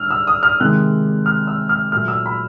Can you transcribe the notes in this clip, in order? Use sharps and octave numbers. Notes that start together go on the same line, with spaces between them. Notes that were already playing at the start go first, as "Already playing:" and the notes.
Already playing: D3 G3 E6 F6
E6
D#6
F6
C3 D#3 G#3 F#6
F6
E6
F6
A#2 F#3 A3 F6
E6
B5